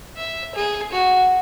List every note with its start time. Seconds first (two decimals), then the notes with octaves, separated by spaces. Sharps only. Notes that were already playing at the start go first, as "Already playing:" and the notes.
0.17 E5
0.55 G#4
0.93 F#4